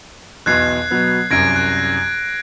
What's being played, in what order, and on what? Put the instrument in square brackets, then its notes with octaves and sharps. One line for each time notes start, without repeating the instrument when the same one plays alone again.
[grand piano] B1 E2 B2 [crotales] F#6 G#6 C7
[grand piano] B2 F#3 B3
[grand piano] C2 F#2 [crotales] G#6 A#6 D7
[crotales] F#6